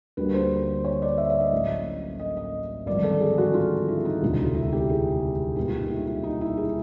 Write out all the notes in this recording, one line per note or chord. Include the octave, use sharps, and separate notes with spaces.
D2 D3 G3 A#3 B4
C5
C#5
D5
E5
E5
D#5
A1 A2 F#3 A#3
D#5
D#5
G#1 G2 D3 F3 D5
A4
G#4
F#4
F4
E4
D#4
E1 D2 C3
E4
G4
G#4
C2 B2 G3 A#3 G4
F4
D#4
E4
E4
D#4
E4
G#4